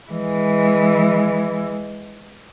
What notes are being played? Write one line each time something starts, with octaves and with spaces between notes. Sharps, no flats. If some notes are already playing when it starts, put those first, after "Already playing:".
E3 G#3